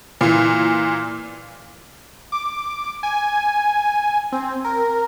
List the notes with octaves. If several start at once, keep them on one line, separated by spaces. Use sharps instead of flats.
A#2 E3
D6
G#5
C4
A#4